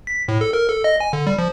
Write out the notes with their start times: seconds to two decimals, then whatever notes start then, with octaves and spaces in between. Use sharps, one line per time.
0.07 B6
0.28 A2
0.41 A4
0.53 A#4
0.68 A4
0.84 D#5
1.00 G#5
1.13 D3
1.27 G3
1.39 F3